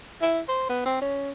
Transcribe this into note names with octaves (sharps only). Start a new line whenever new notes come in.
E4
C5
B3
C4
C#4